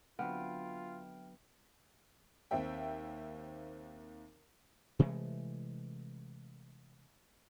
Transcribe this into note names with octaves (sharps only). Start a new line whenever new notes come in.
D3 F#3 B3 C4 F4 E5 G5 F6
D#2 C4 E5 G5
C3 E3 G#3 A3